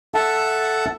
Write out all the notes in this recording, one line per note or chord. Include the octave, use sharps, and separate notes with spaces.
A4 E5 F#5 A5